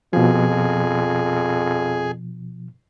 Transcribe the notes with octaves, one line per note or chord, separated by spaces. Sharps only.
F2 B2 F3 G#4